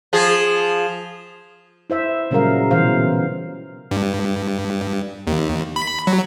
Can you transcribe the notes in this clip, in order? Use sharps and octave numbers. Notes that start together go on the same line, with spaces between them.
F3 F4 G#4
E4 C5 E5
A#2 C#3 F#3 G3 A#4 F5
B2 E3 C5 F5
G2
D#2
B5
F#3